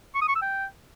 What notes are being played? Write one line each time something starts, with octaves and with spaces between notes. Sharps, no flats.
C#6
D#6
C#6
E6
G5